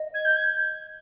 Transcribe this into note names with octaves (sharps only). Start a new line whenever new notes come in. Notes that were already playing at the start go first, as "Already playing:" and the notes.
Already playing: D#5
G#6
G6
G#6